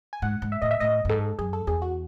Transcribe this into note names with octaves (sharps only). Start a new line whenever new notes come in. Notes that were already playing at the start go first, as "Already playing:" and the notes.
G#5
G#2 F#5
G#2
E5
A2 D#5
E5
A2 D#5
F#2
G#2 A4
F#2 G#4
A4
E2 G#4
F#4